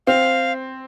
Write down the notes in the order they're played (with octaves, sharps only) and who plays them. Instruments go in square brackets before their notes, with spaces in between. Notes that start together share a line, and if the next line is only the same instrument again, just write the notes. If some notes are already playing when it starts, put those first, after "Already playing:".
[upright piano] C4 [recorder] F5